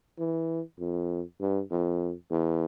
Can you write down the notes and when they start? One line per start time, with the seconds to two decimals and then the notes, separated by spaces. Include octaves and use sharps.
0.19 E3
0.79 F2
1.40 G2
1.71 F2
2.30 E2